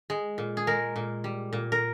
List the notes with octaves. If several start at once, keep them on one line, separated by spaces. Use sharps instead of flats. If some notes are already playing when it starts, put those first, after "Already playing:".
G#3
A#2
G#4
G#3 A#4
A#2
G3
A#2
A#4